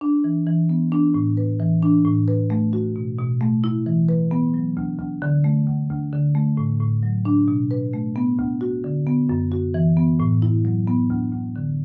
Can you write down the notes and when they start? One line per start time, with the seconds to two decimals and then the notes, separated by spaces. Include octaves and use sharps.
0.01 D4
0.24 E3
0.47 E3
0.69 B3
0.92 D4
1.14 A2
1.37 B4
1.60 E3
1.83 D4
2.05 A2
2.28 B4
2.50 A3
2.73 F#4
2.96 B2
3.18 B2
3.41 A3
3.64 E4
3.86 E3
4.09 B4
4.31 B3
4.54 F#3
4.77 D2
4.99 D2
5.22 D3
5.44 A3
5.67 D2
5.90 D2
6.12 D3
6.35 A3
6.57 A2
6.80 A2
7.03 F#3
7.25 D4
7.48 B2
7.71 B4
7.93 A3
8.16 B3
8.39 D2
8.61 F#4
8.84 D3
9.07 B3
9.29 F#2
9.52 F#4
9.74 E3
9.97 B3
10.20 A2
10.42 E4
10.65 F#3
10.88 B3
11.10 D2
11.33 D2
11.56 D3